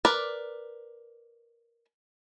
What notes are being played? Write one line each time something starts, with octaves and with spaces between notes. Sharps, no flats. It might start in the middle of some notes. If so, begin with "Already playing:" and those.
A#4 B4 D5